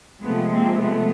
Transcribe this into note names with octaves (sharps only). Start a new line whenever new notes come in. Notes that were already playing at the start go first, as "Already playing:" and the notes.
C3 F3 G#3 A3 B3
A#3 C4
A3 B3